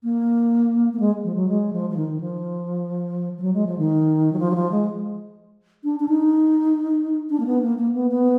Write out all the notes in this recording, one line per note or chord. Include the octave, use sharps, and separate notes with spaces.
A#3
A#3
G#3
F3
F#3
G#3
F3
F3
D#3
F3
F3
F#3
G#3
F3
D#3
F#3
F3
F#3
F3
G#3
D4
D4
D#4
D4
A#3
B3
A#3
A#3
B3
B3